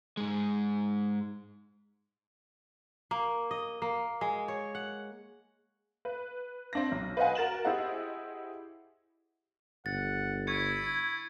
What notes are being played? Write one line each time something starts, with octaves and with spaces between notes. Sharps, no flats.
G#2 G#3
A#3
D#5
A#3
G#3
C#5
F#5
B4
C4 D4 A#6
B1
B4 C5 D#5 F5 F#5 G#5
F#4 A#4 A6 E7 F#7
E4 G4 G#4 C5 D#5 F#5
G1 F#5 A6
E4 C#6 G#6 C#7